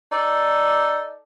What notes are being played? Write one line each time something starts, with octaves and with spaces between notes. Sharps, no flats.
D#4 A4 D5